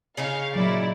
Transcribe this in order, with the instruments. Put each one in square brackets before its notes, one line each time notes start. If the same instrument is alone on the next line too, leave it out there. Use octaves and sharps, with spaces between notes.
[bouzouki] C#3 C#4 D#4 [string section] F5
[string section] A#2 E4 D5 [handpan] F#3